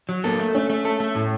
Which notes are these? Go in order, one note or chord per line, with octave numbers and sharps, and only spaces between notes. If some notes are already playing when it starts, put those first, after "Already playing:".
F#3
A#3 A4
A3
A3 C#4
A3
A4
A3
A2